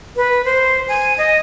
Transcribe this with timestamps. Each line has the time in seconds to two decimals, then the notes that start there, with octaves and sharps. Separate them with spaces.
0.16 B4
0.45 C5
0.88 G#5
1.18 D#5